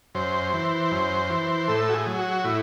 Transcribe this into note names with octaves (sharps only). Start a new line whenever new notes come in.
F#2 C5
E3
F#2
E3
A2 A4
F#4
G#4
F#3
F#4
A2 E4